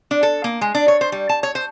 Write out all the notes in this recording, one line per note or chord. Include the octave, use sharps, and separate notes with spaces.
D4
A4
A#3
G#3
D4
C#5
C5
G3
A5
C#5
C5